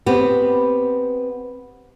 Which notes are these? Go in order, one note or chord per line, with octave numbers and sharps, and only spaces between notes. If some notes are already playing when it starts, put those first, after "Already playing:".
B3 C4 G4